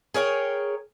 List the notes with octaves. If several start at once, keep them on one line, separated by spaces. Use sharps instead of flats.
G#4 A#4 C#5 G5